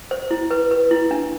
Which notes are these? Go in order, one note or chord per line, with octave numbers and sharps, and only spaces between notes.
C5
E4
B4
B4
E4
D4